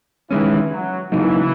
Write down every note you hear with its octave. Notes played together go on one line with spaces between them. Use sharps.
D#3 E3 G#3 C#4
F#3
C#3 E3 F#3 A#3 D#4